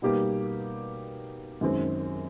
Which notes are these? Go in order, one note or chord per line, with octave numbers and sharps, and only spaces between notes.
B2 G3 A#3 D#4 G4
F#2 D#3 G#3 C4